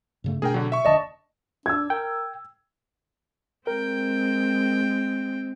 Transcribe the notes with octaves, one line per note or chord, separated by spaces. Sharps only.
G2 C#3 A3
B2 A3 D4 G#4 A#4 G5
B2 D3 F#3
E5 C#6
F1 D3 D5 D#5 A5
D4 E6 G#6
A#4 G5
G#3 C4 A#4 G5